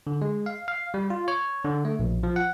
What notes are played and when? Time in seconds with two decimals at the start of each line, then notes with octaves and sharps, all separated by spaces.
0.07 D3
0.22 G#3
0.46 F5
0.68 F5
0.94 G3
1.10 F4
1.28 C#5
1.65 D3
1.85 A3
1.99 A#1
2.23 F3
2.36 F#5